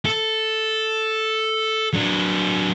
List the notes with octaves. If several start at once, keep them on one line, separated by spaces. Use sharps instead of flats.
A4
F#3 D4